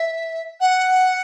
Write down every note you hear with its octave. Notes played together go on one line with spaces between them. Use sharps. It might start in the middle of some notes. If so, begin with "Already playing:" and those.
Already playing: E5
F#5